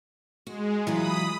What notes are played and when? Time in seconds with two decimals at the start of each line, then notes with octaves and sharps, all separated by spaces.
0.47 G#3 F#4
0.87 E3 F#3 F4 B5 D#6